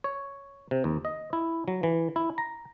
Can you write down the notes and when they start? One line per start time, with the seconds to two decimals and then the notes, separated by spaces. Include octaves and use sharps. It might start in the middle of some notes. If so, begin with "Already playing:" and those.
0.04 C#5
0.71 C3
0.84 D#2
1.05 D#5
1.33 E4
1.68 F#3
1.83 E3
2.16 E4
2.38 A#5